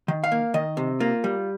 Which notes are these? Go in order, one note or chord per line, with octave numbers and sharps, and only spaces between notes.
D#3
F5
A#3
D#3 D#5
C3
A#3 F4
G3